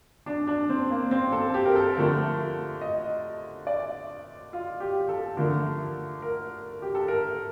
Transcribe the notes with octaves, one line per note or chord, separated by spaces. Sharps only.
D4
D4
C4
A#3
C4
A4
G4
A#4
A4
D3 F3 A3 A#4
D#5
D5
F4
G4
A4
D3 F3 A3 A#4
A#4
G4
A4
A#4